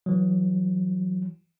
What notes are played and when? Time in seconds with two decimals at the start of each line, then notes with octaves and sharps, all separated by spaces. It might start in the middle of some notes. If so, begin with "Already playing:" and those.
0.06 E3 F#3